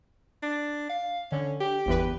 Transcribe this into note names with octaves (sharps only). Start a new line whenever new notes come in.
D4
F5
D3 C#4
G4
G1 E2 B4